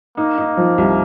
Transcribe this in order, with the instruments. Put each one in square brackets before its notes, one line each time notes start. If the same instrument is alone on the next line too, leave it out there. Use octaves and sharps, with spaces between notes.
[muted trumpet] A#3 [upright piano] D#4
[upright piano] D#4
F3
C2